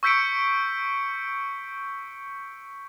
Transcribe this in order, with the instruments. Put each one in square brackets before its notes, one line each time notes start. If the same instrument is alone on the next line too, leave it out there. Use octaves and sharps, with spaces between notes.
[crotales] C#6 E6 G6 B6 C#7 D7